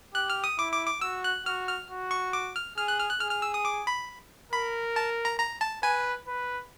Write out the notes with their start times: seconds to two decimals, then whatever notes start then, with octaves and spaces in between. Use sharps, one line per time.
0.14 G4 F#6
0.30 F6
0.44 D#6
0.58 E4 D6
0.73 D6
0.87 D6
1.01 F#4 E6
1.24 F#6
1.46 F#4 F6
1.68 F6
1.90 F#4
2.11 C#6
2.33 D6
2.56 F6
2.77 G#4 F6
2.88 F#6
3.00 F6
3.10 F#6
3.20 G#4 F6
3.31 F6
3.42 E6
3.54 D#6
3.65 D6
3.87 B5
4.52 A#4 B5
4.96 A5
5.25 A#5
5.40 A#5
5.61 A5
5.83 B4 G#5
6.27 B4